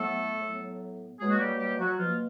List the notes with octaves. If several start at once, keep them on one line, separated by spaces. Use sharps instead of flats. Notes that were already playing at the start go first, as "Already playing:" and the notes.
Already playing: A2 F#3 A3 B3 A4
A2 F#3 B3
B2 F#3 G#3 A#3 G#4
F#4
G3 G4
G3 G4
F#3 F#4
B2 F3 F#3 A#3 F4